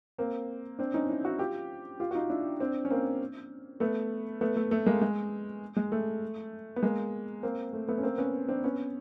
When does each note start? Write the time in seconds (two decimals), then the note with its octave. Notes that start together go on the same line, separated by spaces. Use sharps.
0.18 A#3 C4
0.79 C4 D4
0.94 C#4 D#4
1.09 D4 E4
1.24 E4 F#4
1.39 F4 G4
2.00 F4 G4
2.11 F#4
2.15 D#4 F4
2.30 D4 E4
2.60 C4 D4
2.85 C#4
2.90 A#3 C4
3.80 A3 B3
4.41 A3 B3
4.56 A3
4.71 A3
4.86 G#3 A#3
5.01 G#3
5.76 G#3
5.92 A3
6.76 B3
6.82 G#3 A#3
7.43 A#3 C4
7.73 A3
7.89 A3 B3
7.98 C#4
8.03 A#3 C4
8.18 B3 C#4
8.48 C4 D4
8.64 B3 C#4